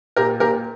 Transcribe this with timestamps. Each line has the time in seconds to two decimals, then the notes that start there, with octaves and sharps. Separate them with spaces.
0.17 A#2 G4 A#4
0.40 A#2 G4 A#4